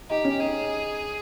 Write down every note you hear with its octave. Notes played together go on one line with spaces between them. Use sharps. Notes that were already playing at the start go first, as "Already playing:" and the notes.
D#4 G4
C#4
D#4 G#4